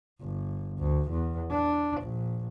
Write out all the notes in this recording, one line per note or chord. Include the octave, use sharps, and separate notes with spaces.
G1
D2
E2
D4
A#1